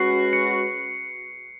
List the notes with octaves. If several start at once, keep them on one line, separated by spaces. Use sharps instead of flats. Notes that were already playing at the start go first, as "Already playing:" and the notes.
Already playing: G#3 C#4 F#4 B4 C7
C#7